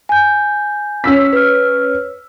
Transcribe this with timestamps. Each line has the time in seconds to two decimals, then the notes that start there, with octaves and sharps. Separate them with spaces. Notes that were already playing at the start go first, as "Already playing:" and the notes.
0.09 G#5 G6
1.04 C#4 E6 B6
1.33 B4 F6